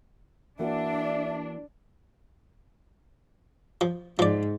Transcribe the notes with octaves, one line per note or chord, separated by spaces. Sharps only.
E3 A#3 D4 F#4 E5
F3
G#2 F3 D5